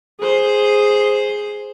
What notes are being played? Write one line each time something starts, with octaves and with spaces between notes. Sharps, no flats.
G#4 C5